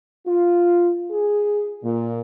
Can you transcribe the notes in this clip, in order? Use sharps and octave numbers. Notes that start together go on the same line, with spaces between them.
F4
G#4
A#2